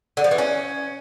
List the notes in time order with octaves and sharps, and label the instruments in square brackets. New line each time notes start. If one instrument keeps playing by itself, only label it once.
[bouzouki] D3
F3
E3
C#4